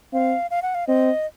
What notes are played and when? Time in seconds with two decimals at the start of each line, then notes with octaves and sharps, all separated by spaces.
0.13 C4 F5
0.51 F5
0.62 F#5
0.75 F5
0.87 C4 D#5